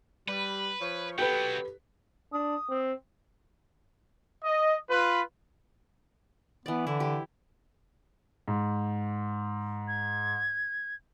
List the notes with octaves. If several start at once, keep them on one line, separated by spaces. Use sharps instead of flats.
G3 B4
F3 C#5
F#3 B3 G4 A4 B4 G5
D4 D#6
C4
D#5
F4 B4
E3 B3 D5
D3 E4
G4
G#2
G#6